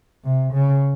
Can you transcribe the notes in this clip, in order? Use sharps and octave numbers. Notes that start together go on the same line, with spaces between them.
C3
C#3